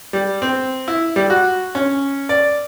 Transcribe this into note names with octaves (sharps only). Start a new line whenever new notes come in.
G3
C4
E4
G3
F#4
C#4
D5